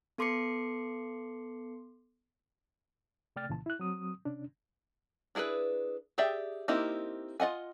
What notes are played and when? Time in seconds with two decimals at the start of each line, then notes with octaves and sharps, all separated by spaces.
0.18 B3 A4 C6 D6 C7 C#7
3.36 C3 A3 D5 G5 F6 A6
3.49 C2 A#2 C#3 E3 A5
3.66 E4 F#6
3.80 F#3 C4 D#6
4.25 C3 C#4 D4
5.35 D4 E4 G#4 A4 B4
6.18 G4 G#4 D5 E5 G5
6.68 A#3 C4 D#4 E4 G4
7.40 F4 D#5 F#5 G#5